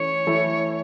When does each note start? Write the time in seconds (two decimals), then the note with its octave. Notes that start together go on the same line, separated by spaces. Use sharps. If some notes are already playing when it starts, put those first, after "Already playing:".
Already playing: E3 A3 C#4 C#5
0.27 E3 A3 E4